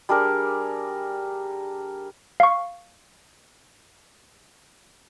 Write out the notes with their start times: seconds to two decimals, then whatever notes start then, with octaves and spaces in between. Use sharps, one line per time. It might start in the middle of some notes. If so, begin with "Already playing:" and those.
0.09 G3 D4 G#4 A#4
2.40 F5 C#6